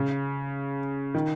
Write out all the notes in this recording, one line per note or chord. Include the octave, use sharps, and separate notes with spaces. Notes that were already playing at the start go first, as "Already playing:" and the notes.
Already playing: C#3
D#3